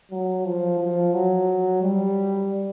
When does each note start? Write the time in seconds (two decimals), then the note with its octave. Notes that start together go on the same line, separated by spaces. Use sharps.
0.11 F#3
0.45 F3
0.79 F3
1.14 F#3
1.82 G3